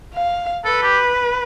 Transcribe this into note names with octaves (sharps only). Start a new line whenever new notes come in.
F5
A4 B4
G4